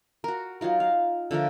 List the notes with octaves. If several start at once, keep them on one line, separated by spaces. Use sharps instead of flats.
F#4 A#4
F#3 D#4 F4 A#4
F5
D3 F3 A3 A#4